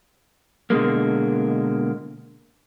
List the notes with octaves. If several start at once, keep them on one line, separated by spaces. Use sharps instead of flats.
B2 D3 D#3 G#3 A#3